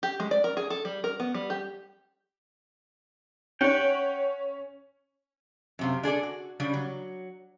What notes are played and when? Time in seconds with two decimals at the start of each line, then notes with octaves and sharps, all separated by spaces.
0.03 G4
0.20 G#3
0.31 D5
0.44 A#4
0.57 G#4
0.70 A4
0.85 G3
1.04 A#4
1.20 B3
1.34 G3
1.50 G4
3.61 C#4 C#5 F#5 G5
5.79 F#2 C3 F5
6.03 D4 G#4 A4 D5
6.23 F#4
6.60 C#3 G3 D4
6.73 F#3